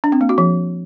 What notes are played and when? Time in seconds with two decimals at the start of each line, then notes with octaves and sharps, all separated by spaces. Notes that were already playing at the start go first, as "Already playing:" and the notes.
0.04 D4
0.12 C4
0.21 A#3
0.29 F#4
0.38 F3